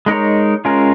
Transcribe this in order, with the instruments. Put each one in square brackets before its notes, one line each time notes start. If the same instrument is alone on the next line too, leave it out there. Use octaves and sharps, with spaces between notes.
[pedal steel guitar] G#3 D#4 A#4 C#5
G#3 C#4 F4 A#4